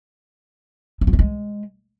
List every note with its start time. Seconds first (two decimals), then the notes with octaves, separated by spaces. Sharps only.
1.01 E3
1.07 F3
1.13 A3
1.19 G#3